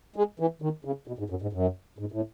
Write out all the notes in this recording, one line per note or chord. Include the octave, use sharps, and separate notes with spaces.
G#3
E3
D#3
C#3
B2
G#2
F#2
G#2
F#2
G#2
A2